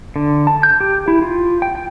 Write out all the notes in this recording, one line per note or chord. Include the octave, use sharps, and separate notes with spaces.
D3
A5
G6
G4
E4
F4
G5
G5